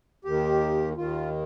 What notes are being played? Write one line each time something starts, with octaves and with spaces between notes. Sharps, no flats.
D#2 D#3 G4
D#2 D#3 F4